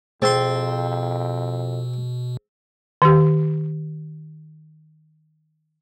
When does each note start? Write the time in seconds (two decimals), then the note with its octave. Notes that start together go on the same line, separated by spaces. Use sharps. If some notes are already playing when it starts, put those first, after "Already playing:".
0.22 F2 B2 C4 G#4 C5 C6 A6
3.02 D#3 G4